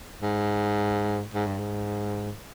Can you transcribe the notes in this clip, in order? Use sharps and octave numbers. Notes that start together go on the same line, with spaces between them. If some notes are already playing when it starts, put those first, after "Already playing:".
G#2
G#2
G2
G#2